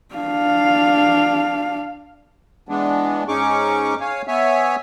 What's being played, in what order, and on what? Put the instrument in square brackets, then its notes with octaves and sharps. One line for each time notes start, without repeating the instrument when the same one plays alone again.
[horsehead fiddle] D4 F5
[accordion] E3 G#3 B3 D4
G#2 C#4 D#4 G#4 C#6 D6
C#5 F5 G#5
B3 C#5 E5 G#5